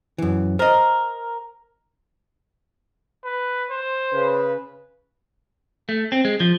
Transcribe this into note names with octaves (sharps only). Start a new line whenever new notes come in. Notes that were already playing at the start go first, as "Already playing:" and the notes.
F#2 E3
A#4 C5 D#5
B4
C5
C#3 B4
A3
C4
G#3
F3